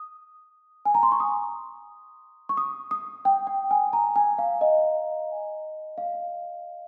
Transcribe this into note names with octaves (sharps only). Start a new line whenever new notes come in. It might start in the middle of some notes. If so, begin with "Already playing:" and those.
Already playing: D#6
G#5
A#5
C6
C#6
D#6
C#6
D#6
D#6
G5
G5
G#5
A#5
G#5
F5
D#5
F5